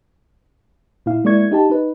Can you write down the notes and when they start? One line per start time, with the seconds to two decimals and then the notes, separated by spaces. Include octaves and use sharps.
1.06 A#2 E4 F5
1.24 G#3 A#3 E4 D5 C#6 G#6
1.51 D#4 G4 A5
1.70 D#4 B4